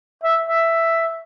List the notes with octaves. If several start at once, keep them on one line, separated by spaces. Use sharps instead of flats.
E5
E5